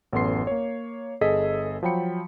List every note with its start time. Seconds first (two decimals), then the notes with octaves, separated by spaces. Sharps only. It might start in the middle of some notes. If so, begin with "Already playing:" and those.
0.13 A1 F#2 B3 A4 C6 C7
0.47 A#3 C#5
1.21 G1 G#4 A4 D#5 E6 B6
1.83 F3 F#3 G5 B5 C#7